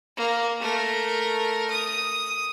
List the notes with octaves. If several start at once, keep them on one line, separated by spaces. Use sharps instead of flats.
A#3
A3 A#4
D#6